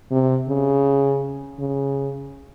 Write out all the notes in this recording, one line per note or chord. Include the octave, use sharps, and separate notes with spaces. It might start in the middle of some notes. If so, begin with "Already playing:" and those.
C3
C#3
C#3